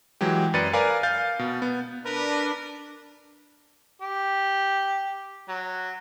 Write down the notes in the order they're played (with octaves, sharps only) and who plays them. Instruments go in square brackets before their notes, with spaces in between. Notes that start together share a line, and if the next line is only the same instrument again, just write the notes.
[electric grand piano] E3 F#3 G#3 G4
F#2 B4 D5 A6 C#7 D#7
A#4 B4 D5 F5 G#5
F5 G6 A6
B2
B3
[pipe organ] D4 [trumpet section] A#4 B4
[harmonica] G4
F#3